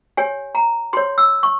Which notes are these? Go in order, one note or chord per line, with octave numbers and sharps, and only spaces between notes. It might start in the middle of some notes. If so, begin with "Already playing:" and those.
G4 C#5 G#5
A#5
G4 C#5 C6
E6
C#6